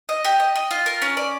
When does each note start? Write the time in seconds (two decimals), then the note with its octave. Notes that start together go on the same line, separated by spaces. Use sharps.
0.09 D#5
0.25 G4
0.40 D#5
0.56 D#5
0.71 F4
0.86 A#4
1.02 C#4
1.17 D5